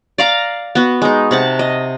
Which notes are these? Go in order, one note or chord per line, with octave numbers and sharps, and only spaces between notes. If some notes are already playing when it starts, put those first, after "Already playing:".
D5 F5 A#5
B3 F#4
G#3 D#4
C3 F#5 A5
D#5